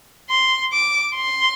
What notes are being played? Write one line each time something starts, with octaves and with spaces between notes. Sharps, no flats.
C6
D6
C6